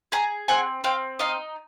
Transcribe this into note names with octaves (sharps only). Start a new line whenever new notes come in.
G#4 G#5 A#5
C4 F#5 G#5
C4 F5 G5
D#4 D#5 F5